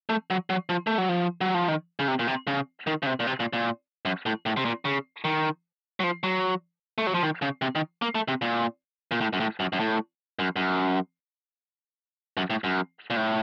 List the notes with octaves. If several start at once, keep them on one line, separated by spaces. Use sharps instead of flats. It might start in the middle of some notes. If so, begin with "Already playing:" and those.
A3
F#3
F#3
F3
A3
F#3
F3
F#3
F3
D#3
C#3
C3
A#2
C3
C#3
D#3
C#3
C3
A#2
C3
A#2
A#2
F#2
A2
A2
C3
A#2
C#3
D#3
F#3
F3
F#3
A3
F#3
F3
D#3
C#3
C3
D#3
A#3
A3
C3
A#2
A#2
A2
F#2
A2
F#2
F#2
A2
F#2
F#2
F#2
A2
F#2
A#2
A2